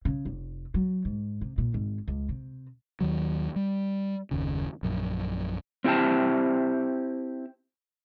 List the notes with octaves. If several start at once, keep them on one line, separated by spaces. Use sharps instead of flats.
C#3
F1
F#3
G#2
C3
A#2
G#1
C#2
C3
D#2 D#3 F#3
G3
F#1 D#2 C#3
A#1 F#2
C4 E4 G4 E5 G5 A5